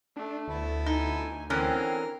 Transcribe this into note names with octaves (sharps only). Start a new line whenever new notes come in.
A3 D4
D2 B3 E4 A4
D#4 G#5
D3 E3 C4 C#4 A#4